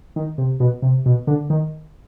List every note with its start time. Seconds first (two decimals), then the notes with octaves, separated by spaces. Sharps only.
0.16 D#3
0.38 C3
0.60 B2
0.82 C3
1.06 B2
1.27 D3
1.50 D#3